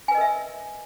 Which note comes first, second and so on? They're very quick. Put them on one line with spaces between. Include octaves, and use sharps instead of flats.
G#5 B4 D#5 A#4 E5